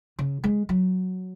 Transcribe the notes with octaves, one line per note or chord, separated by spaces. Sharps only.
C#3
G#3
F#3